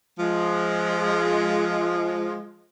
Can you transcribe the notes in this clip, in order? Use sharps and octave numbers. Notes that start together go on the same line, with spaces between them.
F3 G#3